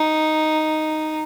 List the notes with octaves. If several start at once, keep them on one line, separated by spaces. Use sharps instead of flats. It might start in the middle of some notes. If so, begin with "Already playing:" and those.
Already playing: D#4